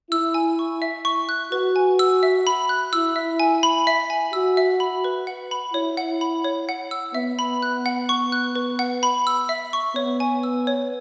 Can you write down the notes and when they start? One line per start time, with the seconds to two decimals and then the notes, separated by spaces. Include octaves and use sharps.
0.11 E4 E6
0.34 G#5
0.59 C#6
0.82 E5
1.05 C#6
1.29 F#6
1.52 F#4 B4
1.76 G#5
1.99 E6
2.23 E5
2.47 B5
2.69 F#6
2.93 E4 E6
3.16 E5
3.40 G#5
3.63 B5
3.87 E5
4.10 G#5
4.33 F#4 E6
4.57 E5
4.80 B5
5.04 B4
5.27 F#5
5.51 B5
5.74 E4 C#5
5.97 F#5
6.21 B5
6.44 C#5
6.69 F#5
6.91 E6
7.14 B3 E5
7.39 B5
7.62 F#6
7.86 F#5
8.09 C#6
8.32 F#6
8.55 B4
8.79 F#5
9.03 B5
9.27 E6
9.49 E5
9.73 C#6
9.96 B3 C#5
10.20 G#5
10.43 E6
10.67 C#5